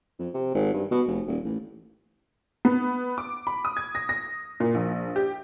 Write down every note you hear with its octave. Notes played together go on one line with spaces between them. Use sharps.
F2
C3
G#1
G2
B2
F1
D#1
A1
B3
D6
B5
D#6
G#6
A#6
A#6
A#2
A#1
G4